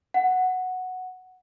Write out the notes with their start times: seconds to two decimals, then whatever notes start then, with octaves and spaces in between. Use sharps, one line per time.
0.14 F#5